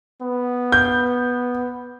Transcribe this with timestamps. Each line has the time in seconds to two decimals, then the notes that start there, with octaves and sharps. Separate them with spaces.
0.22 B3
0.72 G6